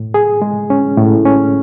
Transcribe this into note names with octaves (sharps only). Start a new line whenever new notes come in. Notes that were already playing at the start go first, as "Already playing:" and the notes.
Already playing: A2
G#4
G#3
C#4
A2
C#4